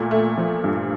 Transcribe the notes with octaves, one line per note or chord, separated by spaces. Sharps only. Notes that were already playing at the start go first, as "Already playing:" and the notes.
Already playing: A#2 A3
A3
F3
G2